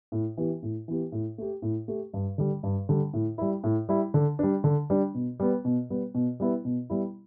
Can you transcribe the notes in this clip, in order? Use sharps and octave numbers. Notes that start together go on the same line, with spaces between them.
A2
E3 B3 G4
A2
E3 B3 G4
A2
A3 G4
A2
A3 G4
G2
D3 G3
G2
D3 G3
A2
G3 E4
A2
G3 E4
D3
G3 D4
D3
G3 D4
B2
G3 B3
B2
G3 B3
B2
G3 B3 E4
B2
G3 B3 E4